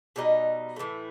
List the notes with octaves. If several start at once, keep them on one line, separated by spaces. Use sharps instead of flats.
B2 G3 D#4
A2 E3 A3